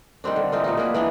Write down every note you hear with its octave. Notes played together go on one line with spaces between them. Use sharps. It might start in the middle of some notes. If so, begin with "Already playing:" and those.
D#3 G3 C4 D4
D3
E3 C4 D#4 F4
A#2 F#3 D#4
A#3 D4 G#4 B4
E3 B3 D4